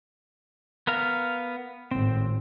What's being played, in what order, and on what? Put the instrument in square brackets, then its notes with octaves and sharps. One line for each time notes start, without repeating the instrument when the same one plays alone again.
[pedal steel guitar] B3 A#4 F5
[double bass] G#1 A2 [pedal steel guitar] C4